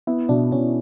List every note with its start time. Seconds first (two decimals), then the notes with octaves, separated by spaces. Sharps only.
0.07 B3 E4
0.29 B2 D4
0.52 B2 C#4